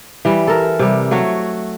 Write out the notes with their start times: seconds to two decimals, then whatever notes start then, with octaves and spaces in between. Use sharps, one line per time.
0.25 E3 G3
0.47 A4 A#4
0.79 C3 G3
1.11 F#3 A3 F#4 C#5